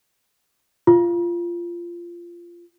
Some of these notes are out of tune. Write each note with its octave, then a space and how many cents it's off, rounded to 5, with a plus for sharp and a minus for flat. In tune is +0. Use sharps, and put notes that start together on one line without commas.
F4 -15